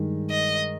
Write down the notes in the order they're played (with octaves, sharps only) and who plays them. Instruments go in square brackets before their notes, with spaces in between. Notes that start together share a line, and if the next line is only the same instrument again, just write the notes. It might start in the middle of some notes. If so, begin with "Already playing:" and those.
Already playing: [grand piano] G2 D#3 G#3
[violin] D#5